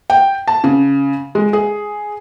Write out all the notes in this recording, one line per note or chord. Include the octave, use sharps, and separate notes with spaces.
G5
A5
C#3
G#3
G#4